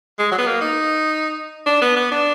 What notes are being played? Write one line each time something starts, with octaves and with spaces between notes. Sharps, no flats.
G#3
F#3
B3
A#3
D#4
D4
B3
B3
D4